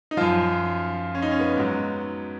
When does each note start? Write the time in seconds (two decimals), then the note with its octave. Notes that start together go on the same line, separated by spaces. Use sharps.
0.11 D#4
0.17 F#2 F3 F4
1.15 C#4
1.22 D#4
1.31 C#4
1.40 B3
1.57 G#2 F#3